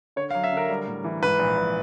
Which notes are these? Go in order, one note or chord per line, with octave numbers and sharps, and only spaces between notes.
D3 C#5
F5
F#3
E5
D3 A#4
G3
A2
E3
G#2 B4
A#1
A#1